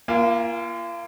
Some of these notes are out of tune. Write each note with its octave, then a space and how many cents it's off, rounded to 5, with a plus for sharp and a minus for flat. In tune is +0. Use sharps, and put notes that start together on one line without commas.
A#3 +20 F4 -35 G#5 -30